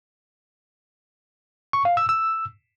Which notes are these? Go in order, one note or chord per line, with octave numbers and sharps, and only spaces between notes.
C#6
F5
E6
E6